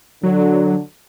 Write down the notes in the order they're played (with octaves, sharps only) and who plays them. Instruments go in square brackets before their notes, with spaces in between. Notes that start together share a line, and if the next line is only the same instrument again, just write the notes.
[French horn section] D3 [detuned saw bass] F#3